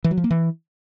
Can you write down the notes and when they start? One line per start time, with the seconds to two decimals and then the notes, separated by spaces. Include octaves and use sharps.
0.04 E3
0.11 F#3
0.17 F3
0.24 A#3
0.31 E3